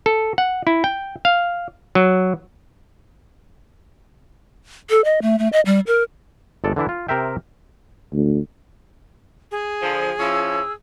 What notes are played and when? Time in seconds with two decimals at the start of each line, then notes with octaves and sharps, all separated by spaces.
0.06 A4
0.38 F#5
0.67 E4
0.84 G5
1.25 F5
1.95 F#3
4.90 A4
5.05 D#5
5.22 A3
5.39 A3
5.53 D#5
5.66 G3
5.87 A#4
6.64 G1 G#3 A4 D5
6.76 D3 E3 D4 E4
6.89 F4
7.08 C3 A#4 C5 E5 G5
8.13 D2
9.51 G#4
9.82 D3 F3
10.20 F3 C#4 E4 E6